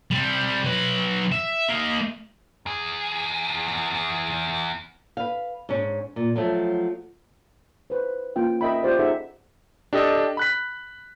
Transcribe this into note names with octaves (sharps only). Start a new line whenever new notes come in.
G3 C4
F#3 B4
E5
A#3 D#5
E2 G#4
B4 F5
G#2 C#4
A#2
F3 F#3 A3
B4 C5
A#3 C#4 F4 G5
C#4 A#4 D#5 E5 G5 B5
F4 G4 C5 D5
D#4 G#4 A4 E5 F#5
D4 G4 A4 D#5
B5 F#6 B6